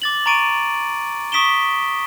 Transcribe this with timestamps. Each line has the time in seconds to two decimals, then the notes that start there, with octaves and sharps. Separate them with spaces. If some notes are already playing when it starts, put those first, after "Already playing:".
0.02 D6 A6 F#7
0.26 A#5 C#6 A6 D7 D#7
1.32 C#6 D#6 B6 D7 E7 G7